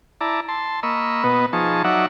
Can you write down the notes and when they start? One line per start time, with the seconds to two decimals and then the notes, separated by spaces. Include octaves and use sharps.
0.21 E4 D5 A5 A#5
0.48 A5 C6
0.83 A#3 D#5 B5 C#6 E6
1.24 B2 B3 B4 D#5
1.53 F3 D#4 G#4 A5 C#6
1.84 F#3 D#4 D5 E5 F#5